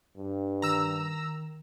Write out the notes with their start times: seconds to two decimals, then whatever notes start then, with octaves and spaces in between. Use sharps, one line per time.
0.17 G2
0.62 D#3 A#5 E6